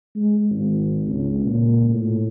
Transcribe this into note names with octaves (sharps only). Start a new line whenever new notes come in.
G#3
G#1
C#2
A#2
A2